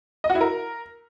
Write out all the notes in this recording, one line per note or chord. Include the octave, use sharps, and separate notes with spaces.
D#5
F#4
E4
A#4